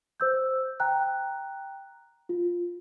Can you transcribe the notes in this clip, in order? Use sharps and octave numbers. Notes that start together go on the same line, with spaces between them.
C5 E6 G6
G5 A#5 F#6
F4